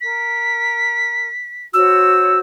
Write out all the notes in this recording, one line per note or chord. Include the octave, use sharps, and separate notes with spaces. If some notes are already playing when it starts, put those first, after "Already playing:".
A#4 B6
F#4 C5 C#5 E6